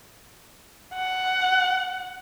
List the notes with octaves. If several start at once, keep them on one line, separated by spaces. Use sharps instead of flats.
F#5